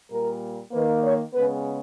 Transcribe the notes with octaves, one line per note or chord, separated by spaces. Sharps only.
A#2 G3 A#3 A#4
D#3 A#3 B4
C#5
C#3 G#3 B3 B4